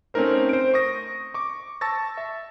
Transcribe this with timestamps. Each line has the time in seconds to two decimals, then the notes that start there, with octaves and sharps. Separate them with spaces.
0.14 A3 C4 C#4 D#4 A#4 C5
0.49 C5 D7
0.74 C#6 D#6 A#6
1.34 C#6 D6
1.81 A5 C#6 E6 A6 A#6
2.17 E5